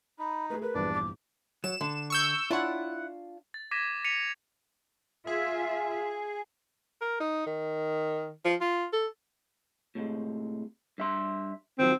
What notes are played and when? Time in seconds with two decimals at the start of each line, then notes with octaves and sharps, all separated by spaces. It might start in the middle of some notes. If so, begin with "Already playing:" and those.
0.19 D#4 B5
0.50 A3 G#4 B4
0.62 A#4 B4
0.75 A#1 E2 G2 D4 D5
0.93 D6
1.64 F#3 E7
1.81 D3
2.10 C#6 E6 G6
2.51 D4 E4 F4 C#5 F#5
3.54 A6
3.71 D6 G#6 A#6 B6 D#7 E7
4.04 B6 C#7 D#7 F7
5.27 F4 G#4 E5
7.01 A#4
7.20 D#4
7.46 D#3
8.45 F3
8.61 F4
8.93 A4
9.95 A2 C3 G#3
10.98 G2 E5 C6
11.79 D#3 F3 F#3 C4